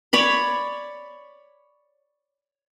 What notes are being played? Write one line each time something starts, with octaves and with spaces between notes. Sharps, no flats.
C#5 D5 B5